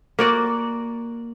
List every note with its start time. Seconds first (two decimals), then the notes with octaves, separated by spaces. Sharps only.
0.19 A#3 F#4 D5